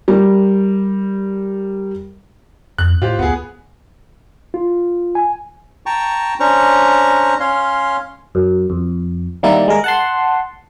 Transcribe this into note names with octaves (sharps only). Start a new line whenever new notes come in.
G3 A#4
F2 F#6
A2 F4 G4 C5
D2 B3 G#4
F4
G#5
G5 A5 A#5 C#6
C#4 D4 C5 A#5 C#6
C#4 C#5 F5 C6
F#2
F2
D#3 G3 A#3 E4 D5
G#3 A#4
F#5 A5 C6